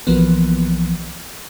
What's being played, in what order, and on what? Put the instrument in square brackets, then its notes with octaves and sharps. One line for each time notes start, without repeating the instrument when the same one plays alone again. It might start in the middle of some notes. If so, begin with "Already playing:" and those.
[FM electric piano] B1 E3 F3 A#3 B3